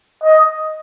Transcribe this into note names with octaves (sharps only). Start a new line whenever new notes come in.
D#5